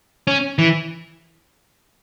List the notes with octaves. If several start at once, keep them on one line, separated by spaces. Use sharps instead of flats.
C#4
E3